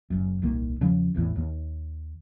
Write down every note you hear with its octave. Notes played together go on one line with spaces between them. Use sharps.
F#1 F#2
D#1 C2 D#3 A#3
E2 C#3 F3 C#4
G#1 E2 A2 E3
D#2